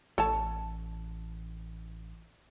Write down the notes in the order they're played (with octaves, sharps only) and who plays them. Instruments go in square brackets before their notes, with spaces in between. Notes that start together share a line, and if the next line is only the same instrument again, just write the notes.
[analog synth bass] A1 [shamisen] A4 C#5 A5